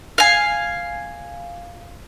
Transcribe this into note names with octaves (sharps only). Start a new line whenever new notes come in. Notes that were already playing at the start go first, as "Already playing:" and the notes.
F5 G#5